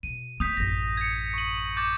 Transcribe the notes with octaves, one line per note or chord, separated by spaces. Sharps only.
B2 D#7
B3 D#6 G6 B6
A1 F#2 A#6
G#6 C#7
C#6 F#7
D6 G6 A6